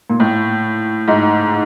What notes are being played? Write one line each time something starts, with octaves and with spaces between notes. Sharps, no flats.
A#2
A2
G#2